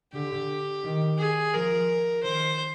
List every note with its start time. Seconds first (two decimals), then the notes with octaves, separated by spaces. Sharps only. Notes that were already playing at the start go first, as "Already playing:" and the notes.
0.13 D3 G4
0.84 D#3
1.18 G#4
1.54 F3 A#4
2.23 D#3 C5